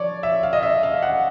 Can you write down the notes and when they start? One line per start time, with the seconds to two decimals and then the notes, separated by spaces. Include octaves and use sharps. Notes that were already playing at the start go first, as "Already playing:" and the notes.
Already playing: F3 C#5 D5
0.23 E5
0.43 F5
0.53 D#5
0.63 E5
0.83 F5
1.03 F#5